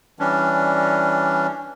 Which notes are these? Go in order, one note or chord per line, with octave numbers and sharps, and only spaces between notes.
E3 G3 C#4 D4